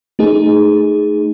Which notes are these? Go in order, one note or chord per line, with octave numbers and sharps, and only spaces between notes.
A3 D#4 G#4